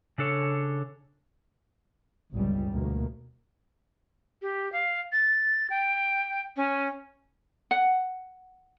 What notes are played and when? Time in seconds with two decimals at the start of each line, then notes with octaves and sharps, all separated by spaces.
0.18 C#3 D4 A4 C#5
2.33 G1 C#2 G3
2.72 D2 B2 A#3
4.42 G4
4.72 F5
5.12 A6
5.70 G5
6.56 C#4
7.71 F#5